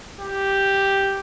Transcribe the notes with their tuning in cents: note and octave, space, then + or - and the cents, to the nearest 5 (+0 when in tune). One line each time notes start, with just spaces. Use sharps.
G4 +0